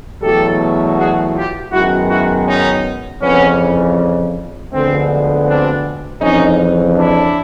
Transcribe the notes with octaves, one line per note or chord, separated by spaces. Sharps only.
E2 B2 F#3 A3 G4 A4
F#4 G#4
F4 G4
F#2 D#3 G#3 B3 E4 F#4
E4 F#4
C#4 D#4
F2 C#3 E3 B3 C#4
D2 D3 F3 G#3 B3 C4
C4 D4
F2 C#3 E3 C#4 D#4
D4 E4